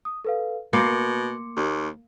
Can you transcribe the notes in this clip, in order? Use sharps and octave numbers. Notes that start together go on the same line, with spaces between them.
D#6
A4 B4 F5
B2 A#3 C6 D6 C#7
D#2